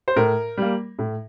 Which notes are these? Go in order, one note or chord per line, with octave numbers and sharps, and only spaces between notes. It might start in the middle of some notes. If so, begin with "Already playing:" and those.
C5
A2 A#4
G3 A#3
A2